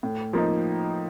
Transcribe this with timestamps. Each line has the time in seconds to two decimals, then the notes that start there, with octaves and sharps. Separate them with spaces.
0.03 A2
0.33 F3 A#3 D#4